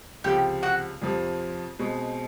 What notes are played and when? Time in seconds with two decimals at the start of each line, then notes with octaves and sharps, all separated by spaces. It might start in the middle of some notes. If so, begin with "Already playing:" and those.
0.24 C#2 C3 F3 G4
0.63 F#4
1.02 F2 C3 F3
1.79 B2 G#3 C4